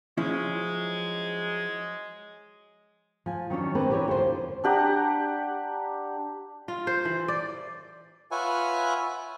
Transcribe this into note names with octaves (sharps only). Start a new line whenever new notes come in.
F3 F#3 G#3 C#4 E4
F3 G#5
D#3 F#3 C#4 D4
A#3 C4 D4 G4 B4
E3 G4 C#5
D#2 D3 F3 C5
D4 G4 F#5 A#5
F4
C5
E3
D5
F4 B4 C#5 E5 F#5 G#5